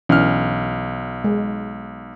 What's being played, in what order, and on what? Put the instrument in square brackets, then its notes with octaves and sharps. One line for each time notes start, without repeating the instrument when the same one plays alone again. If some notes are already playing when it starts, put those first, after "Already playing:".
[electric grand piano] B1 F6 [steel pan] E3 C#4 D4
[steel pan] G#3